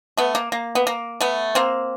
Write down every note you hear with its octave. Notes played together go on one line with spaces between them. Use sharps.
A3 B3
A#3
A#3
B3
A#3
A3 B3
A#3 C4